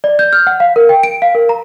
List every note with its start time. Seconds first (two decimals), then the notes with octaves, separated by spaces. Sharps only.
0.04 D5
0.19 G6
0.33 F6
0.47 F#5
0.60 F5
0.76 A#4
0.89 G5
1.03 D7
1.22 F5
1.35 A#4
1.49 A#5